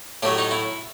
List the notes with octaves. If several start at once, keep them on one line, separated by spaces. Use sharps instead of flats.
A2 F#3 A3 G4
D#4
E4